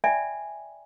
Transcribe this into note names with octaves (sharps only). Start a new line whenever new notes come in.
D5 E5 G5 G#5 B5